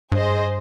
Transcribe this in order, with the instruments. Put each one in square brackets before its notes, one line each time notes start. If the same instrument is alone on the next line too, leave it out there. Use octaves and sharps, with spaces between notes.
[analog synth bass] G2 [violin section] G#4 C5 D#5